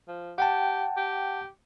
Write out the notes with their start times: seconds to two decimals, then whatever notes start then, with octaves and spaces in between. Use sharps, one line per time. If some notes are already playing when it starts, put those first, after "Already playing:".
0.08 F3
0.38 G4 F#5 G5 A5
0.97 G4